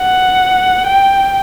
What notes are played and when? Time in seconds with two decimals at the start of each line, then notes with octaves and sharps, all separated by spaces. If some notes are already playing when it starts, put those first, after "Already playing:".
Already playing: F#5
0.87 G5